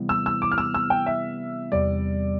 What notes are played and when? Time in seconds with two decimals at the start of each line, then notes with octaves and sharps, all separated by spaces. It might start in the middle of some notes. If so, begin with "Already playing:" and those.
Already playing: C3 E3 G3 B3 E4
0.09 E6
0.26 E6
0.42 D6
0.52 F6
0.58 E6
0.74 E6
0.90 G5
1.06 E5
1.72 E2 C3 G3 D5